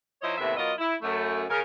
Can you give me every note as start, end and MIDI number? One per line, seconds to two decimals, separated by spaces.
0.22 0.35 53
0.22 0.35 63
0.22 0.35 64
0.22 0.35 72
0.22 0.35 73
0.22 0.35 75
0.38 0.56 39
0.38 0.56 45
0.38 0.56 48
0.38 0.56 59
0.38 0.56 76
0.57 0.72 54
0.57 0.72 59
0.57 0.72 65
0.57 0.72 70
0.57 0.72 75
0.78 0.95 64
1.02 1.44 42
1.02 1.44 57
1.50 1.60 49
1.50 1.60 70